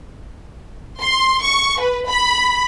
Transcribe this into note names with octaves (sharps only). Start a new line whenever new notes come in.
C6
C#6
B4
B5